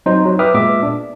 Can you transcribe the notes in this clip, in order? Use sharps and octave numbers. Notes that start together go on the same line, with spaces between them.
F#3 C4 D#4 C5
F#3
B4 E5 G5 D6 D#6 F6
A#2 G#3 B3 E5 D6
D4